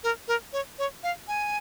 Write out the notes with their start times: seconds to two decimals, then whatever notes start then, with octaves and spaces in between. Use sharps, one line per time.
0.04 A#4
0.28 A#4
0.53 C#5
0.79 C#5
1.03 F5
1.28 G#5